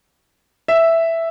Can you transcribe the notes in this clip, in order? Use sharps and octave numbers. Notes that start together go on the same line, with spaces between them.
E5